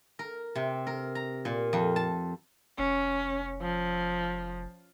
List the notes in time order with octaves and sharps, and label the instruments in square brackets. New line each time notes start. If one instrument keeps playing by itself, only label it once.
[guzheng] A#4
C3
A#4
A#5
A#2
F2
A5
[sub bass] F1 [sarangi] C#4
[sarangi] F3